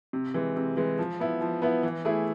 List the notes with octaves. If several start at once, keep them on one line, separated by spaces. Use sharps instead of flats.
C3
E3 G#3
C3
E3 G#3
F3
B3 E4
F3
B3 E4
E3
A3 E4 G#4